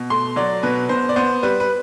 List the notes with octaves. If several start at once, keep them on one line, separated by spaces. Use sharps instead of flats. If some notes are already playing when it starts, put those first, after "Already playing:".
Already playing: B2
A3 C6
F#3 D5
B2 B4
B2 C5
D5
B3 C5
G3 B4
B4